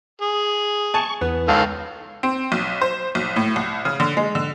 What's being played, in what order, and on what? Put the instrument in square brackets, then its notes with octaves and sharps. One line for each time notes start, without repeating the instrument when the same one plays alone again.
[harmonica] G#4
[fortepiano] G#5 A5 [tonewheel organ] C#6
[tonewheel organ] E2 [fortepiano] B3
[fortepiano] C#2 [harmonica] D#3 A4 F5
[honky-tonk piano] C4
B1
C5
B1
A2
C2
C#3
D3
G#3
D3